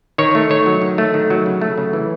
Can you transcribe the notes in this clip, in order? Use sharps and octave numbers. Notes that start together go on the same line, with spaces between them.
D#3 C#5
A3
D#3 C#5
F#3
D#3
A3
D#3
F#3
C#3
A3
C#3
E3